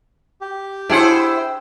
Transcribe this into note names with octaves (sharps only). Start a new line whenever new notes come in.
G4
D4 E4 G#4 C5 F#5 G5 E6